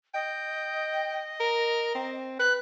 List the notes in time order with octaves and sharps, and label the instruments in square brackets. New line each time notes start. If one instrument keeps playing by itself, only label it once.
[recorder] D#5 [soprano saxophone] G5
[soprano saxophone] A#4
C4
[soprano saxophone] B4 [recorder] F#6